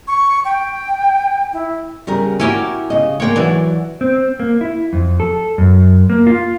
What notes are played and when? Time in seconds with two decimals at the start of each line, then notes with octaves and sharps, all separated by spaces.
0.08 C#6
0.45 G5
1.53 E4
2.07 C#3 G3 A#4
2.40 C#4 E4 F#4 G4 A#4
2.90 C#3 D#5
3.20 G#3 A#3 D4 C#5 G5
3.36 E3 F#3 D5 F#5
4.01 C4
4.40 A#3
4.61 E4
4.93 F2
5.20 A4
5.58 F#2
6.10 A#3
6.27 F4